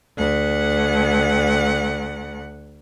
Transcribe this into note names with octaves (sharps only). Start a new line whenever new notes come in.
D2 F#5